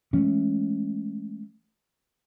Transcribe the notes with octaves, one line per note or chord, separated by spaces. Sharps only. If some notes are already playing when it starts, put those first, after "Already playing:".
E3 G#3 A3 C#4